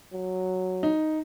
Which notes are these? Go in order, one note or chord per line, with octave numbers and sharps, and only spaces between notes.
F#3
D#4